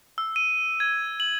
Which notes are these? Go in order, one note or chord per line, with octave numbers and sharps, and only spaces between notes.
E6
D#7
G#6
F#7